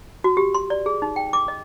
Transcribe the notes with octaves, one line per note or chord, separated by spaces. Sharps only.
F#4
G4
C6
D5
G#4
D#4
G5
D6
D#5